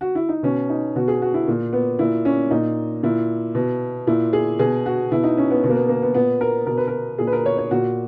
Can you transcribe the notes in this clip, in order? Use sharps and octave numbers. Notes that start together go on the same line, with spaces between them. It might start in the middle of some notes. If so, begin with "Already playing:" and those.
F#4
E4
D#4
B2 C#4
D#4
B2 F#4
G#4
F#4
E4
A#2
B3
A#2 E4
C#4
A#2 D#4
A#2 E4
B2
A#2 E4
G#4
B2 G#4
F#4
B2 E4
D#4
C#4
B3
B2 B3
A#3
B3
A#3
B3
A#2 B3
A#4
B2 A#4
B4
A#4
A#2 G#4
B4
A#4
C#5
C#5
A#2 F#4